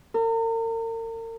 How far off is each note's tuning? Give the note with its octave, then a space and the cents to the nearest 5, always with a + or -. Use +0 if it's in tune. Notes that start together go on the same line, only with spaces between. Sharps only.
A#4 -40